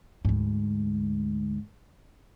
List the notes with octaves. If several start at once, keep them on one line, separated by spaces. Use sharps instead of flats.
D2 G#2